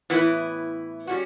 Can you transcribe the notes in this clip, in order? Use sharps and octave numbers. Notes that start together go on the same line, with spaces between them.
A2 E3 B3 E4 B4
G3 C#4 F#4